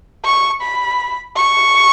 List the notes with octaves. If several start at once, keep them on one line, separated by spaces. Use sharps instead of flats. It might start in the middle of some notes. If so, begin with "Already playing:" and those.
C#6
B5
C#6